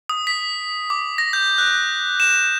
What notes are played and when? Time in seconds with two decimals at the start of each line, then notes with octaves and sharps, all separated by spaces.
0.09 D#6
0.27 B6
0.90 D6
1.18 A#6
1.33 G6
1.58 F#6
2.20 E7